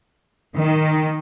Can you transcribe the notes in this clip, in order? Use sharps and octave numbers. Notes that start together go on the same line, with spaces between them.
D#3